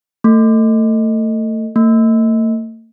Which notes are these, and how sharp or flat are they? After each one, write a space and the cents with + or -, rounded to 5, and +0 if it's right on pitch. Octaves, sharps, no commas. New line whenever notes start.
A3 +25
A3 +45